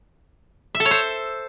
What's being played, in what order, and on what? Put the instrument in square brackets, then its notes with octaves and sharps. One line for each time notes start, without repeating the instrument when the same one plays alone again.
[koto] E5
A4
C#5
C5